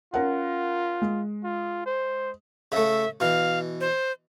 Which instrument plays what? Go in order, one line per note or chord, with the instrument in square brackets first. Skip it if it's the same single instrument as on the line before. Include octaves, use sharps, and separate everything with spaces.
[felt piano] C#4 A#4 F#5 [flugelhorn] F4
[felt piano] G#3
[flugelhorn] F4
C5
[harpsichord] C#3 A3 [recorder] E5
[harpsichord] B2 E3 [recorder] F5
[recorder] C5